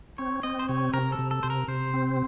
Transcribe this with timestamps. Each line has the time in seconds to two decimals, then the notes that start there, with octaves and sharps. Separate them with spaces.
0.18 C4 C#5
0.43 C4 D#5
0.59 C5
0.68 C3 C#5
0.93 C3 A#4
1.12 A4
1.19 C3
1.31 A4
1.43 C3 C5
1.50 A#4
1.68 C3 C5
1.94 C4